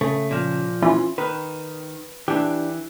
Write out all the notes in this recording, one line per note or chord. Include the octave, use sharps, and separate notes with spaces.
C#3 A3
A#2 F3
E3 C#4 F4
D#3 B4
E3 D4 G4